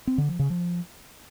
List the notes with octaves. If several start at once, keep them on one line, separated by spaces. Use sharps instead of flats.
C4
D3
F3
C#3
F3